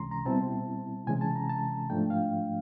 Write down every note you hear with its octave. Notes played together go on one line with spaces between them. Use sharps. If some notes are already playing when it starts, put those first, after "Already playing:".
Already playing: C#2 C3 E3 G#3 C#4 A#5 C6
A#5
B2 G3 C4 E4 A5
C3 E3 G#3 C#4 G#5
A5
A#5
A5
G#2 F3 A3 D4 G5
F5